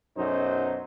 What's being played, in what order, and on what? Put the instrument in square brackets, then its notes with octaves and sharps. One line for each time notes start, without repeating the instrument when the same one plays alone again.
[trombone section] B1 F#2 F#3 D#4 C5